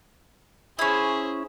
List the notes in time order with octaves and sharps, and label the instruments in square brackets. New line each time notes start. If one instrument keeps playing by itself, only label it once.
[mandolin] C#4 E4 [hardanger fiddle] G#4 C5